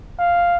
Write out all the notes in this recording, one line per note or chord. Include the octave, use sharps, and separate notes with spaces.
F5